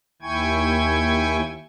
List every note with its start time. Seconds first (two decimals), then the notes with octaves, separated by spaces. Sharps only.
0.22 D#2 E4 G5 G#5 C#6 G#6